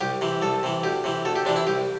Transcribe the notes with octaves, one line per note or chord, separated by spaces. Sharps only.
C2 G4
C3 E3
C2 A4
C3 E3
D2 G4
C3 E3
D2 A4
G4
C3 E3 D4
E4
C2 G4